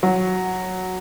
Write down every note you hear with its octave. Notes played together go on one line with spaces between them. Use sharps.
F#3